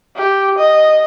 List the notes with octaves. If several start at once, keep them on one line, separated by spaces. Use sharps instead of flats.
G4
D#5